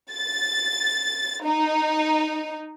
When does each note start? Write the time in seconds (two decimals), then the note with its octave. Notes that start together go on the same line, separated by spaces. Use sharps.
0.12 A6
1.43 D#4